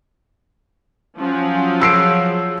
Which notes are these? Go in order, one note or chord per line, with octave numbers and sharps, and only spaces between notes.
F3 F#3 C#4
G#4 E6 C7 D7